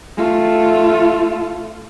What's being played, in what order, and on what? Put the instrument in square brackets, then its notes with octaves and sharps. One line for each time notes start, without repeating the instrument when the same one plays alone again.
[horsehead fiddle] A3 F4